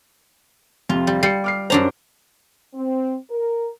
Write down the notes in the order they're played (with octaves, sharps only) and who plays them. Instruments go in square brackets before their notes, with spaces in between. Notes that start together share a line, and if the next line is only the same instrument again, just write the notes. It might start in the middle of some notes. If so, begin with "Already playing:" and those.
[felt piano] F2 C3 [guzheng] F4
[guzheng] G3
[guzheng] G3 [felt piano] C7 C#7
[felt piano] D6 F6 C7
[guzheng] F#2 D4 A#5 [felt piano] C5 C#5
[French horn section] C4
A#4